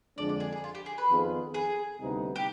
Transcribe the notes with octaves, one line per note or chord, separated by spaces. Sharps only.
F2 D3 G#3 D4 D5
D5
G#4
G#4
F4
G4
G#4
B4
F2 D#3 B3 F4 G#4
G#4
D2 C3 G3 B3 D#4
G4